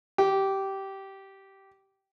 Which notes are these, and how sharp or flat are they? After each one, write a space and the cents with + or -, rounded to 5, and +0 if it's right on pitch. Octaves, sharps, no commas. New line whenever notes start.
G4 -15